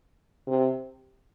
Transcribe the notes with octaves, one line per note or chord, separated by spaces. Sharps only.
C3